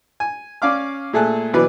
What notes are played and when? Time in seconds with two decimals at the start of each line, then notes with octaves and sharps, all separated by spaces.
0.20 G#5
0.62 C#4 D5 F5 D6 F6
1.13 A#2 A3 G#4 A4 F#6
1.54 B2 E3 F#3 B4 D5